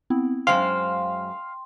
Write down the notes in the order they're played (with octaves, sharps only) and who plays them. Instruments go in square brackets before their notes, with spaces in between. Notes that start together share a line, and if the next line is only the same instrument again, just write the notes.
[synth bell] B3 C4 E4
[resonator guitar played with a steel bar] F#2 G#3 C5 [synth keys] F5 [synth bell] G5 [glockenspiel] C6